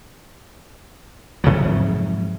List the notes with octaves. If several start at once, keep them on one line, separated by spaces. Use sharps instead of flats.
G#2 C3 F3 F#3